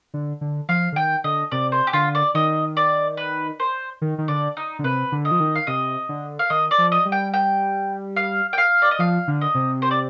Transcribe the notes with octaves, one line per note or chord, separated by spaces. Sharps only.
D3
D3
F3 F5
D3
D#3 G5
D3 D#5
C3 D5
C5
G4
D3 F4
D5
D#3 D#5
D5
B4
C5
D#3
D#3
D3 D5
D#4
D3
C3 B4
D3
D#5
F3
D#3
F5
C3 D#5
D3
F5
D#3 D#5
D5
F3
D#5
G3
G5
G5
F5
G5
F5
D5
D#5
F3 F5
D3
D#5
C3
C5
D5